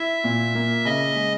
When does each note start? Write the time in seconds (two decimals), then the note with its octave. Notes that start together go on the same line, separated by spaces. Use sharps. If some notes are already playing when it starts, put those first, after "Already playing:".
Already playing: E4 E5
0.24 A#2
0.55 A#3
0.85 C#3 D#5
1.15 G#3